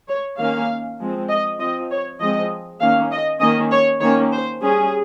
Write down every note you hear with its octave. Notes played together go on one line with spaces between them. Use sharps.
C#5
D#3 A#3 C#4 F5
F3 G#3 C4
D#5
F3 C4 D#5
C#5
F3 G#3 C4 D#5
D#3 A#3 C#4 F5
D#5
D#3 A#3 C#4 D#5
C#5
D#3 A#3 C#4 C#5
C5
G3 C#4 G#4